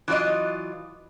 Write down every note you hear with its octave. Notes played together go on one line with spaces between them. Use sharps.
E3 F#3 F4 D5 D#5